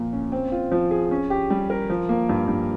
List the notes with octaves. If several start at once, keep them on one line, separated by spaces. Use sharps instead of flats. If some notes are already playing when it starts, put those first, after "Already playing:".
Already playing: A#2 F3 A#3
C#4
C4
F4
F3
G#4
C#4
G4
G3
A#4
F3
A#3
G2
G2